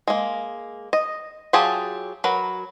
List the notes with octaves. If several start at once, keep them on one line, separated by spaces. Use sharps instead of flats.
G#3 A#3
D#5
F#3 F4 G4 G#4 A5
F#3 A#4 B4